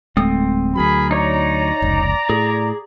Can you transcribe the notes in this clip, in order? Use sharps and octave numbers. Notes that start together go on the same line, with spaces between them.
D1 G#3 A3 C4 D#6
D2 F#3 G#4 A#4 B5
D#4 C#5 D5 A#5
F1 C#2
A2 G#4